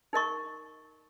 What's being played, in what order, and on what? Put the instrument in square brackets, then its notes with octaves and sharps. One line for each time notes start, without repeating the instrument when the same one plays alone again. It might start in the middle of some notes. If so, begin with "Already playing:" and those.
[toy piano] D#4 A#4 D#5 C#6